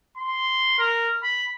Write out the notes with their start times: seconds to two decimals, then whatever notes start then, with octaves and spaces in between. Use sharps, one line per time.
0.18 C6
0.79 A#4
1.23 B5